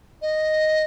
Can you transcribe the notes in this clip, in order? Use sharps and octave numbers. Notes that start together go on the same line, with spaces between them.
D#5